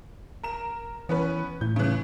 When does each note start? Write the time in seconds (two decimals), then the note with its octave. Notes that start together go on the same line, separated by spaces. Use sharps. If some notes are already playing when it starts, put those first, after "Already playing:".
0.43 A#4 E7
1.09 E3 B3 C#4 B4
1.61 A2 G6
1.76 C#3 E3